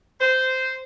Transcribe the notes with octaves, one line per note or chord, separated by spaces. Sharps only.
C5